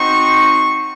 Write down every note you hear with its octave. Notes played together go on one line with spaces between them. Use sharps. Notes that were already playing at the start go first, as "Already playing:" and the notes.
Already playing: C4 D#4 F#4 C#6